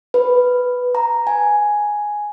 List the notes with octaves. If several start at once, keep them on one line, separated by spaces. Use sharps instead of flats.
B4
A#5
G#5